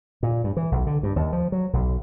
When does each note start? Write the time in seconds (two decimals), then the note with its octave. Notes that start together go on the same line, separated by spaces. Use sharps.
0.23 A#2
0.44 G2
0.57 E3
0.72 B1
0.87 D3
1.03 G2
1.16 D#2
1.33 F3
1.52 F#3
1.73 B1